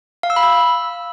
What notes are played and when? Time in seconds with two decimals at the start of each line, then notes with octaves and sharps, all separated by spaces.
0.23 F5
0.30 E6
0.36 B5
0.43 E6